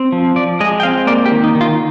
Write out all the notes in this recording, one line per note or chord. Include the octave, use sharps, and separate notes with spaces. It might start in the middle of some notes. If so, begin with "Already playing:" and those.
Already playing: C4
F3
F3 D5
G#3 D#5
G5
C4 F5
A#3 D5
G4
D#3
D#4
D#3
F4